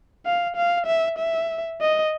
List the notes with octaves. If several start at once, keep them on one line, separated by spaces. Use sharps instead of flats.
F5
F5
E5
E5
D#5